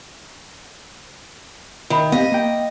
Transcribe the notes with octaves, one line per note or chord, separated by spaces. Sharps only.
D#3 E5 B5
B3 C4 G4 D#5 F5
A#3 G5